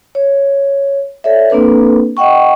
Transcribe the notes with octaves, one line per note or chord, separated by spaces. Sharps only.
C#5
A4 C#5 D5 E5
A#3 C4 D4 A4 B4
D#5 F#5 G5 C#6